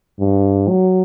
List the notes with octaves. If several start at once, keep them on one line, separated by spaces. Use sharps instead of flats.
G2
F#3